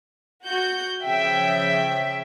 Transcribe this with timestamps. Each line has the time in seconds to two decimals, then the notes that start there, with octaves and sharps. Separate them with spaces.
0.43 F#4 G6
1.03 C#3 F3 E5 G5